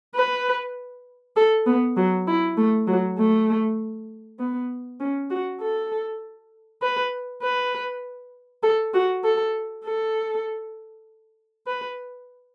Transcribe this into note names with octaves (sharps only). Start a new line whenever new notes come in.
B4
A4
B3
F#3
E4
A3
F#3
A3
B3
C#4
F#4
A4
B4
B4
A4
F#4
A4
A4
B4